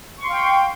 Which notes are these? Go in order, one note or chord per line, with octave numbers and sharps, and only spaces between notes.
F5 G5 C6 C#6